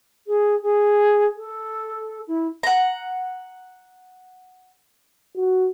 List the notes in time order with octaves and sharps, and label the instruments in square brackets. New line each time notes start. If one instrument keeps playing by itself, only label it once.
[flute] G#4
G#4
A4
E4
[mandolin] F#5 A#5
[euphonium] F#4